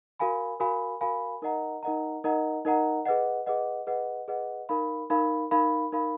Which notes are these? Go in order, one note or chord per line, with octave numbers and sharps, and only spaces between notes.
F#4 A#4 F5 G#5 B5
F#4 A#4 F5 G#5 B5
F#4 A#4 F5 G#5 B5
D#4 A#4 D#5 F#5 A#5
D#4 A#4 D#5 F#5 A#5
D#4 A#4 D#5 F#5 A#5
D#4 A#4 D#5 F#5 A#5
G#4 B4 D#5 F#5
G#4 B4 D#5 F#5
G#4 B4 D#5 F#5
G#4 B4 D#5 F#5
D#4 A#4 F5 B5
D#4 A#4 F5 B5
D#4 A#4 F5 B5
D#4 A#4 F5 B5